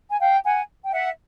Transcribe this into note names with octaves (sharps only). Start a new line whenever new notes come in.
G#5
F5 G5
F#5 G#5
G5
E5 F#5